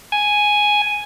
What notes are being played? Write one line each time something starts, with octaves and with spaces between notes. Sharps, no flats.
G#5